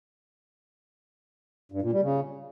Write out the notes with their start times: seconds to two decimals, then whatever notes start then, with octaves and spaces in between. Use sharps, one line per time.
1.72 G2
1.82 A#2
1.92 G3
2.02 C#3